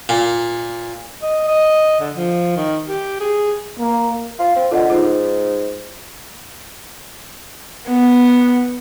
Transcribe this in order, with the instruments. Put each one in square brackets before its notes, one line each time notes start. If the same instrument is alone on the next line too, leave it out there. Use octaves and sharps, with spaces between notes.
[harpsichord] A#2
[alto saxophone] D#5
D#5
D3
F3
D#3
G4
G#4
[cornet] A#3
[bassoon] F4
C4
[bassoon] D3 [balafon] F4 D#5 F#5
[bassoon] G#2 [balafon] D#4 F4
[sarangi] B3